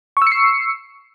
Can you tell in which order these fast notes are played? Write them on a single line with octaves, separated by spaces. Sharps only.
C#6 E6 C#7 C7